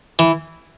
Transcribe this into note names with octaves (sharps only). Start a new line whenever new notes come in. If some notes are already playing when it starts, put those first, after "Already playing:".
E3